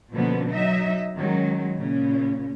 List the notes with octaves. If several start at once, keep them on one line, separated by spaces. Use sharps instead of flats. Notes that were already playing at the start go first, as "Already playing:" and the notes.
B2 D3 F3 A#3 B3 C#4
F#3 D#4 D#5 E5
D#3 F#3 G#3 C#4
A#2 C#3 C#4